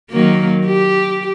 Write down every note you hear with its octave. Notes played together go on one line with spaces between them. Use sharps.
D#3 F#3 A#3
G4